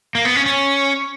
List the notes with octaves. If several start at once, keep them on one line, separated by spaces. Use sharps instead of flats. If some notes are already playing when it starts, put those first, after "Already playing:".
A#3
B3
C#4
C#4